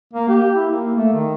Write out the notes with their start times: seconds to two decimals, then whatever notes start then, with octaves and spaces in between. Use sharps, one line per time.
0.13 A#3
0.29 G4
0.55 E4
0.71 A#3
0.95 A3
1.13 D#3